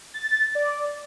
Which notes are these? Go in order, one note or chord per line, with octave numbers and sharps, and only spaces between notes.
A6
D5